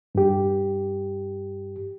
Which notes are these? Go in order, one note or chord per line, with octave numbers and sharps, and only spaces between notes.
G2 G4